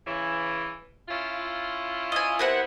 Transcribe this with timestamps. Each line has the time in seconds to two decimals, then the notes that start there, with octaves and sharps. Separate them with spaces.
0.05 C#3 E3
1.08 C#4 E4 F4
2.12 D#5 G#5
2.39 C3 B3 E4 A#4 C5 F#5